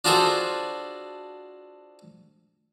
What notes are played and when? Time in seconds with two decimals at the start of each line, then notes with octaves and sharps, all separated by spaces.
0.05 D4 F4 F#4 G#4 A4 C5